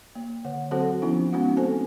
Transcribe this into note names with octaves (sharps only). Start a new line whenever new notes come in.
A#3
D3 C#5 F#5
F#3 C4 F#4 A4 C5 F#5
F3 B3 C#4 D#4 E4
G#3 B3 C#4 D#4 F#4 F#5
A3 C4 A4 C5 G#5